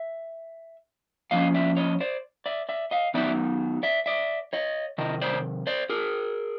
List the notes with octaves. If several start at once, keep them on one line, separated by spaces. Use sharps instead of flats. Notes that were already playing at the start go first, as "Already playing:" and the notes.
Already playing: E5
A2 F3 A#3 C#4 D#5 F5
D5 E5
C#5 D#5
C5 D5
D5 E5
D5 E5
D#5 F5
D#3 F#3 B3 D#4 D5 E5
D5 E5
D5 E5
C#5 D#5
C3 D#3 D#5
C5 D5
C5 D5
G#4 A#4